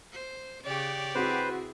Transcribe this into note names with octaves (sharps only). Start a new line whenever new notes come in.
C5
C#3 G4 C#5 D5
C4 E4 F#4 G#4 B4 C5